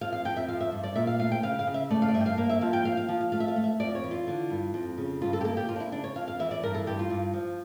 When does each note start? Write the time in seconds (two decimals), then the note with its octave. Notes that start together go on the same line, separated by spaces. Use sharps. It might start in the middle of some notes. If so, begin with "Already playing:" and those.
0.01 F2 F5
0.13 F5
0.25 F2 G5
0.36 E5
0.48 F3 F5
0.60 E5
0.72 G2
0.83 D5
0.96 A#2 E5
1.07 F5
1.19 A3 F5
1.32 G5
1.43 C#3 F5
1.59 F5
1.67 C#3
1.74 E5
1.90 A3 D5
2.02 F5
2.08 D5
2.14 G2 E5
2.20 G5
2.26 F5
2.37 A#3 F5
2.49 E5
2.61 F3 F5
2.73 G5
2.85 A#3 F5
2.97 F5
3.08 F3
3.21 F5
3.32 A3 F5
3.40 E5
3.48 F5
3.56 A3
3.64 E5
3.80 F2 D5
3.95 C#5
4.04 E3
4.11 F4
4.27 D3
4.50 G2
4.74 F2
4.98 C#3
5.21 G2 F4
5.33 A4
5.41 G4
5.44 A#3 A4
5.57 G4
5.69 A#3 F4
5.76 D4
5.80 E4
5.92 C#3 D4
6.04 C#5
6.16 F2 F5
6.28 F5
6.39 E3 E5
6.51 D5
6.63 G2 A#4
6.75 A4
6.86 G2 G4
6.99 F4
7.10 G2
7.34 F3